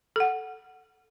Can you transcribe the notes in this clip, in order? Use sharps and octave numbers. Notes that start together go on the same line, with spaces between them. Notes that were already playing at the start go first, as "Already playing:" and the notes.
A4 F#5